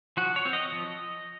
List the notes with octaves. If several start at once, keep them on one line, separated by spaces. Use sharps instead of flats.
F3 F#4
C#5
C4
D#5
F3